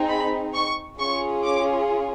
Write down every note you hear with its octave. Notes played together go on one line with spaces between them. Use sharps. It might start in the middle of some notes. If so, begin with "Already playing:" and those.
Already playing: C4 D#4 G#4
B5
C#6
C#4 F4 G#4 C#6
D6